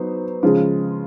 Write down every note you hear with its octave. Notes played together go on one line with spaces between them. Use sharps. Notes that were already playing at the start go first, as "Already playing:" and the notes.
Already playing: F#3 B3 D#4 C5
C#3 F3 G#3 C#4 F4